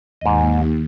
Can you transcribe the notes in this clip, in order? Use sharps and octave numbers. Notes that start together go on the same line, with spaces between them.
D#2 G#2 D#5